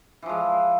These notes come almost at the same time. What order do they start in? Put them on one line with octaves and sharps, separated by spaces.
E3 F3 G#3